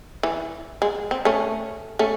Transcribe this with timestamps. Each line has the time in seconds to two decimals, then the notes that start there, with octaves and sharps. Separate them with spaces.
0.23 E3
0.82 G#3
1.11 C4
1.25 A3 C#4
1.99 A3 C#4